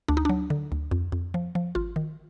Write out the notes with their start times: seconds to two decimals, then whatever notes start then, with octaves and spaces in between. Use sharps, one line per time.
0.08 D2 D4
0.17 D#4
0.25 F#3 D4
0.50 D3
0.72 D2
0.91 F2
1.12 F2
1.34 F3
1.55 F3
1.75 G#1 F4
1.96 D#3